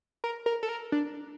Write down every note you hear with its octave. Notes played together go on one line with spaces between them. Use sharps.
A#4
A#4
A4
A#4
D4